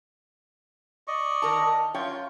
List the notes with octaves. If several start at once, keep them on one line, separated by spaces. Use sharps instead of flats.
D5 D#5 C#6
D#3 A#4 A5
F#2 F4 C#5 G5